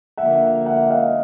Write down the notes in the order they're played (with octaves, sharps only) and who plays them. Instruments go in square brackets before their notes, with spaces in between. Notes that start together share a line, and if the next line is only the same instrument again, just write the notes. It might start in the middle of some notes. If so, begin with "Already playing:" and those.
[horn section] D3 F3 A#3 [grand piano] E5 F#5
[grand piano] E5 F#5
D#5 F5